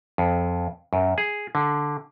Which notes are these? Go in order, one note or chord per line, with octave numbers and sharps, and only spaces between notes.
F2
F#2
G#4
D3